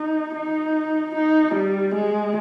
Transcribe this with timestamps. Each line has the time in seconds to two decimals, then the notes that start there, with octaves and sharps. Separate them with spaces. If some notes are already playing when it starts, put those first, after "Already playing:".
Already playing: D#4
0.35 D#4
1.15 D#4
1.54 G3
1.94 G#3